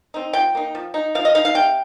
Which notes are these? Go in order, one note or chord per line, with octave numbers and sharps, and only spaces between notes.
C4 D#4
F3 G5
A#3 D#4
F3
D#4
F3 F5
D#5
D#4 F5
F5
C3 G5